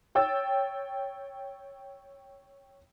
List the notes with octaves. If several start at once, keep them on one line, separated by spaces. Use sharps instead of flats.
C#5 G5 E6 A6